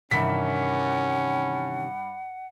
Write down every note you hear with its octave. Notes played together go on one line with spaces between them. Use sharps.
G2 C3 D#3 E3 C#4 F#5 B6